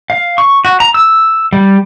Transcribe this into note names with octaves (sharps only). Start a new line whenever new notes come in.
F5
C#6
F#4
A#5
E6
G3